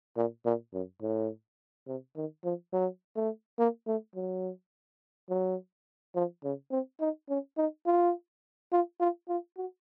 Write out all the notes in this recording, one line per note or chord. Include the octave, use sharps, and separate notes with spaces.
A#2
A#2
F#2
A2
C3
D#3
F3
F#3
A3
A#3
A3
F#3
F#3
F3
C#3
C4
D#4
C#4
D#4
F4
F4
F4
F4
F#4